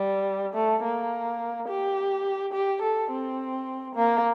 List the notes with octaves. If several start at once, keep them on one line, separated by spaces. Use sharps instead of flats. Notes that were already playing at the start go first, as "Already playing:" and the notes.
Already playing: G3
A3
A#3
G4
G4
A4
C4
A#3